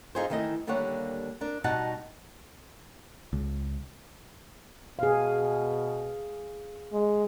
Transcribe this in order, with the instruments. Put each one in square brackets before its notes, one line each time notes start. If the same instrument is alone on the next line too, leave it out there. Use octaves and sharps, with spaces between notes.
[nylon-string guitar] D#4 F4 G#4 A4 C5
D#3 E3 A3 E4 D#5
D#2 D3 G3 A#3 C#5 F#5
D4 A#4
B2 G3 D#4 F#4 F#5 A5
[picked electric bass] C#2
[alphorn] B2 [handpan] G#4 F5
[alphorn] G#3